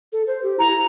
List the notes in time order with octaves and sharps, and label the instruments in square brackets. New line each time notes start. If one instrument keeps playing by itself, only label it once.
[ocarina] A4
C5
G4
[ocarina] E4 [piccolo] A#5